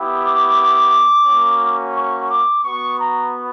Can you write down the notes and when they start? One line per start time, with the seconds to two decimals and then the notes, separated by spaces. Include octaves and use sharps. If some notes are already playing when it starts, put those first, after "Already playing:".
Already playing: B3 E4 G4
0.23 D6
1.27 A#3 C#4 F#4
1.95 C#6
2.29 D6
2.64 B3 F#4 C#6
2.98 A#5